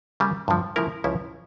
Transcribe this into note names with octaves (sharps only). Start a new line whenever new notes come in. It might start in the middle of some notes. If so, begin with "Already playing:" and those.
C#3 G3 A#3
G2 D3 F3
C#3 F3 A3 E4 A#4
C#2 C#3 F3 C#4 E4